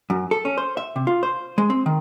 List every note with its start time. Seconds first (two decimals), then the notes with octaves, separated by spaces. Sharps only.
0.10 F#2
0.31 A4
0.45 C#4
0.58 C5
0.77 E5
0.96 C3
1.07 F4
1.23 C5
1.58 G#3
1.70 C4
1.86 D#3